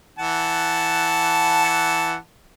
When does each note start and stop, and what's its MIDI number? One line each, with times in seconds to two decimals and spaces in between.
0.18 2.16 52
0.18 2.16 78
0.18 2.16 81